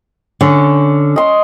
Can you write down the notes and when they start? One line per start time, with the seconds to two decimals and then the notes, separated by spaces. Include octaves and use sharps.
0.41 D3 C#4
1.16 D#5 C6